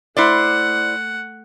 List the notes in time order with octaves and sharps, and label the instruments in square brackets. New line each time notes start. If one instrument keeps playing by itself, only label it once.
[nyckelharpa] A3 F#5 [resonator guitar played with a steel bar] E4 C5 D5